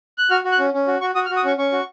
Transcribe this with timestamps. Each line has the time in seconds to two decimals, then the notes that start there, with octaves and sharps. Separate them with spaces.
0.18 F#6
0.30 F#4 F6
0.44 F#4
0.52 F#6
0.59 C#4
0.74 C#4
0.87 F#4
1.01 F#4 C#6
1.15 F#4 D#6
1.26 F6
1.30 F#4
1.36 D#6
1.45 C#4 C#6
1.58 C#4 C#6
1.72 F#4